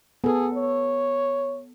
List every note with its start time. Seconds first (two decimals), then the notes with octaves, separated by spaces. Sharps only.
0.24 B3 G#4 A4
0.55 C#5